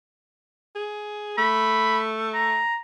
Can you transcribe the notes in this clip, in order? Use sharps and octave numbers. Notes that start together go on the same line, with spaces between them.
G#4
A3 B5
A#5